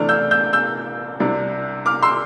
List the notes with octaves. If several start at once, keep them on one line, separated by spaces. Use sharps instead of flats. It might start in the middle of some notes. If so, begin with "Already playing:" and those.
Already playing: C3 E3 A3 D4 F6
E6 G6
E6 G6
E6 G6
C2 C3 G3 D4
D6 F6
C6 E6